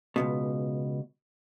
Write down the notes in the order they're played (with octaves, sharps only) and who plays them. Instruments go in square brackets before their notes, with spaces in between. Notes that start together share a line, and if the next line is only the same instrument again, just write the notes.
[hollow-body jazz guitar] C#2 G2 B2